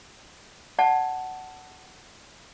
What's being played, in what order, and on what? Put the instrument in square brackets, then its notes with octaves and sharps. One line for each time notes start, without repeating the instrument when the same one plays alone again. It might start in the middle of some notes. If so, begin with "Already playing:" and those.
[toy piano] D5 F#5 A5